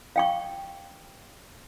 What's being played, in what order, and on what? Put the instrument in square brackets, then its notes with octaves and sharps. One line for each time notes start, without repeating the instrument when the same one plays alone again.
[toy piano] F5 G5 C#6